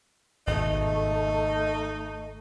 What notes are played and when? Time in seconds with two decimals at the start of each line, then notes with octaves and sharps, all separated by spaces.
0.47 G#1 B2 A3 D#4